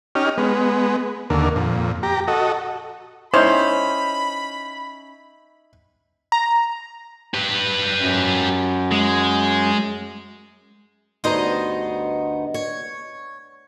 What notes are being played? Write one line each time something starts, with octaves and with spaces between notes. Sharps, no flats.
C#4 D#4 G4 F6
G#3 B3
D#2 D3 A#3
F2 A#2
G4 A#5
F#4 A4 D#5
C#4 D#4 E4 C5 B5
A#5
G4 B4
F#2
G#3
D2 G2 B3 D#4 C5 D#5
C#5